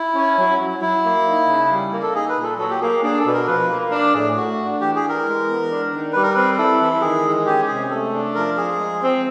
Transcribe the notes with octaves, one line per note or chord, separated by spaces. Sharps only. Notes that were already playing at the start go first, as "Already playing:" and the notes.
Already playing: E4
C#4
F#3
F#3
F#3 E4
A#3
D#4
C#3
G3
A#3
A4
D#4 G#4
B4
A#2
A4
F#3 A4
G4
A#3 G#4
D4 G#4
A4
B2
A#4
F3 B4
A#3
D4 A#4
A2 G#4
A3 F#4
D4
E3 G4
G#4
E3
A#4
G#3
B3
D4
D#3
G3 B4
A#4
C4 B4
E4 A4
E3
D#3 G#4
G#3
C#4 G4
C3 G#4
A3 A4
D4
F3 A#4
F3 G#4
G#3
C4